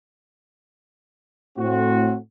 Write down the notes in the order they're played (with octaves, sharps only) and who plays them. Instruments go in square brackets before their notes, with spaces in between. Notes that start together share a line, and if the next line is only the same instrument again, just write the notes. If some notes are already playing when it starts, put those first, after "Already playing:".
[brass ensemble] A2 C4 F#4